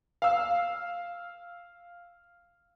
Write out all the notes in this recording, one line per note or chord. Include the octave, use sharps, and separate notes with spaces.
F5 E6